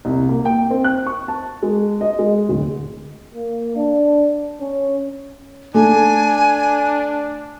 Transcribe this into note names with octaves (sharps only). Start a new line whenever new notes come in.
C2
A#3
G5
C4
F#6
C#6
A5
G#3
D#5
G#3
D1
A#3
D4
C#4
A3 D4 G#5